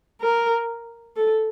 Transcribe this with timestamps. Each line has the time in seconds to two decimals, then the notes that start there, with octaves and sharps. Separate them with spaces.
0.22 A#4
1.17 A4